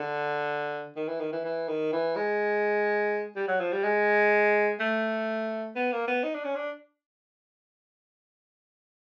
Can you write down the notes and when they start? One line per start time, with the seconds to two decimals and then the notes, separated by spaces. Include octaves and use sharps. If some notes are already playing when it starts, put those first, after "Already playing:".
Already playing: D3
0.96 D#3
1.08 E3
1.20 D#3
1.32 E3
1.45 E3
1.68 D#3
1.93 E3
2.16 G#3
3.36 G3
3.48 F#3
3.61 F3
3.72 G3
3.84 G#3
4.80 A3
5.76 B3
5.92 A#3
6.08 B3
6.23 D#4
6.35 D4
6.45 C#4
6.56 D4